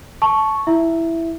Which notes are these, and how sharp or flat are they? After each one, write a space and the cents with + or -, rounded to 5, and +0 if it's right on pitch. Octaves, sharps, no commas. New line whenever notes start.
A5 -15 C#6 +0
E4 +0 E5 +5